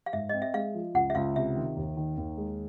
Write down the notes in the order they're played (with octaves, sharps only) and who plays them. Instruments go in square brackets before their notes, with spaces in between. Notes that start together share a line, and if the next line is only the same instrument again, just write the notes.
[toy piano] F5
[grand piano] G#2 [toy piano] E5
[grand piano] C4 [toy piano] D#5
[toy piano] E5
[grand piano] G#3 [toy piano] F5
[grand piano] F3
[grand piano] C#2 [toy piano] F#5
[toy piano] E5
[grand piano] C#2 [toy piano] F5
[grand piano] C3 [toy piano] E5
[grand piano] D#3
D#2
D#3
D#2
G#3